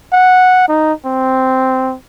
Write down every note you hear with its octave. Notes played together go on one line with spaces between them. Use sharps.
F#5
D#4
C4